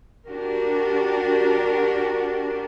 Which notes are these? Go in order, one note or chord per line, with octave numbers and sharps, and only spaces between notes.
D4 F#4 G4 A#4